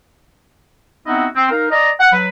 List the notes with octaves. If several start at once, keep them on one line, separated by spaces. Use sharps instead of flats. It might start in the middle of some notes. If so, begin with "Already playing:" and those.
B3 C4 D#4 E4 F#4 D#5
C4
D#4 A#4 F5
D5 D#5 A#5
F#5
F#3 B4